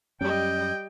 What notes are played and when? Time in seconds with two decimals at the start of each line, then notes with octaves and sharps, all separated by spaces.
0.21 F#2 G3 C#4 D#5 G5